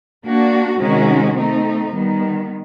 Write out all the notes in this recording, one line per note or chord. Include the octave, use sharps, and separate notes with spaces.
A#3 D4 F#4
C3 D#3 G#3 C#4 F#4
A3 C4 D#4
D#3 G3 B3